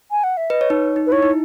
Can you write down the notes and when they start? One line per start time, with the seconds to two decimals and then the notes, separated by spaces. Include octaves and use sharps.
0.11 G#5
0.24 F#5
0.37 E5
0.50 B4 D#5
0.61 C#5
0.70 D#4
0.96 D#4
1.07 B4
1.12 E4 C#5
1.22 D#4